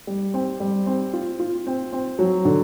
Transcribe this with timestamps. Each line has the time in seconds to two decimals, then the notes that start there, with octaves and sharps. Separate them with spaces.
0.07 G3
0.34 C4
0.60 G3
0.86 C4
1.13 F4
1.40 F4
1.67 C4
1.92 C4
2.19 F#3
2.45 D3